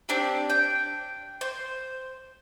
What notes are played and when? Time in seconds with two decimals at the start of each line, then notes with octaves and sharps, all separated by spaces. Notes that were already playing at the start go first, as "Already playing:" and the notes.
0.09 C4 D4 G4
0.50 G5
1.41 C5